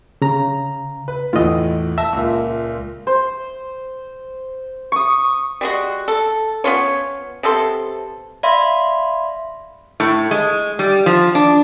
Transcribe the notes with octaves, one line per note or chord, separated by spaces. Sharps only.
C#3 A#5
B4
E2 A2 F4 D#5
E5 A5 A#6
C#2 A#2
C5
C#6 D#6
G3 G#3 F#4
A4
B3 C#4 F4 C#5
C3 B3 A4 C6
D5 E5 F5 B5 C6
A2
G#3
G3
F3
D4